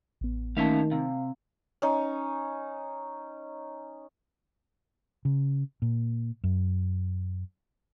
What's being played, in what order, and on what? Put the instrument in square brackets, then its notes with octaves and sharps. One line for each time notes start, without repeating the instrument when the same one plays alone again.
[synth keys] A1 B3
[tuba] D#3 [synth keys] A3 A#3 A5 [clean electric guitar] C#4 E5 F5
[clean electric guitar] C3 [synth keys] F5
[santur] C#4 D#4
[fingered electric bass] C#3
A#2
F#2